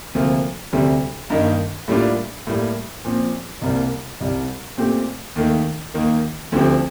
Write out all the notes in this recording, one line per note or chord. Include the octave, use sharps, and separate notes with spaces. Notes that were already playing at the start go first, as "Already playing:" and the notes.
D2 C3 F3 A#3 F4
D2 C3 G3
G2 D#3 A#3 D#4
A2 G3 A#3 D4 F4
A2 G3 A#3
A#2 F3 C4
C2 C3 G3 A#3
C2 C3 G3
A#2 A3 C4 G4
D#2 D#3 A3
D#2 D#3 A#3
D2 D3 F3 C4 G4